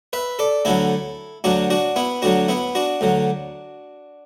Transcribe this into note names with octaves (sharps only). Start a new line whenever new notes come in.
B4 E5
A4 D5
D2 D3 F#3 E4 A4
D2 D3 F#3 D4 F#4
D4 F#4
B3 E4
D2 D3 F#3 D4 F#4
B3 E4
D4 F#4
D2 D3 F#3